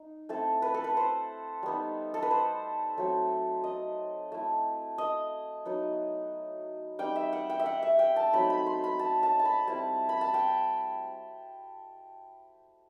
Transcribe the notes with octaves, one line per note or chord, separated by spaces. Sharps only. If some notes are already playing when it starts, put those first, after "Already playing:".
Already playing: D#4
A3 C4 E4 A4
B4
A4
B4
C5
G3 B3 D#4
A4
B4
C5
F#3 A3 C4
D#5
A3 E4
D#5
F#3 B3 D#4
G3 C4 D#4 G5
E5
F#5
G5
E5
F#5
E5
G5
A5
F#3 A3 C4 D#4 B5
B5
C6
B5
A5
A5
A5
B5
G3 C4 E4 A5
B5
A5
G5